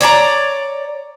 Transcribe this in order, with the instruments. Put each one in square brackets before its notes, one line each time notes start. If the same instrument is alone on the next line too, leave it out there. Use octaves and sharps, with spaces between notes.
[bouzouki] C#5 D5 A5 A#5